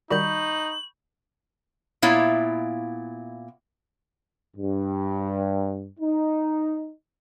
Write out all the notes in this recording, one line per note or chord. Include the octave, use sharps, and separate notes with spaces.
D#3 G3 D#4 F#4 B5 C#6 G6 F#7
A#2 B3 E4 C#5 E5 F5
G2
D#4